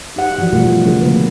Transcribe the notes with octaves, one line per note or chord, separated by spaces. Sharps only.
D#4 G4 F#5
E3 F3 F4 F#4 D5
B2 G3 A3 F4 A#4
C#3 F3 F#3 D4 G#4 A#4
D3 A#3 B3 G#4 B4